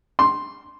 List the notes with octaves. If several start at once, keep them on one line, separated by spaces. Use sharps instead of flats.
C6